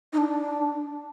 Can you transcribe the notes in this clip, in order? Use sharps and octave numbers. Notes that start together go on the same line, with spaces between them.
D#4
D4